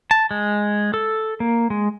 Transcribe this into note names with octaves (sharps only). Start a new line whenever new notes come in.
A5
G#3
A4
A#3
G#3